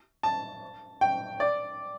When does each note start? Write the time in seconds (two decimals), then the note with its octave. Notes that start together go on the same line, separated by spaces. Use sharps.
0.23 A5
1.01 G5
1.40 D5